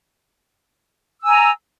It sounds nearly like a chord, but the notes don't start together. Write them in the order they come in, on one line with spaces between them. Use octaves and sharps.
E6 G#5 A#5